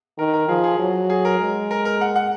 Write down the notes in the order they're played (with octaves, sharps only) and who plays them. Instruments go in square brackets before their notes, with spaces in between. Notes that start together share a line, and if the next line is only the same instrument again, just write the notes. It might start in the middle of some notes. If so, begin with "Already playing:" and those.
[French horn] D#3 [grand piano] A#4
[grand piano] A#4
[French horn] F3 [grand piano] G#4
[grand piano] G#4
[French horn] F#3
[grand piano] G#4
A#4
[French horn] G#3
[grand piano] A#4
A#4
F#5
F#5